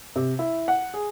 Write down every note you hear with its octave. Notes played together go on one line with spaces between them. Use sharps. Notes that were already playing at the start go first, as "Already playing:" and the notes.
C3
E4
F#5
G#4